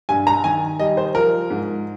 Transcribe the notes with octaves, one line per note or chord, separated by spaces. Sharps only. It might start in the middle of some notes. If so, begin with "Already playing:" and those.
G2 G#5
A#5
D#3 G#5
G3 D#5
C5
F3 A#4
G#2